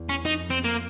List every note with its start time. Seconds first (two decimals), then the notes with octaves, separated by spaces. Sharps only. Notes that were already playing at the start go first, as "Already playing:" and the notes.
Already playing: E2
0.09 C#4
0.25 F2 D#4
0.50 C4
0.64 A#3